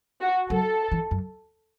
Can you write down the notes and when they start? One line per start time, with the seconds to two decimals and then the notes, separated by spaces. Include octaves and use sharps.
0.21 F#4
0.50 F#3 A4
0.92 E3
1.11 F#2